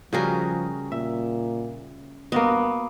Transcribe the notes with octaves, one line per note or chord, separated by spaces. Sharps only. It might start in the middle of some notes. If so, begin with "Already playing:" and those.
C#3 F3 G3 C#4 F#4 G#4 A#4
A#2 E5
G2 A#3 B3 F#4 D#5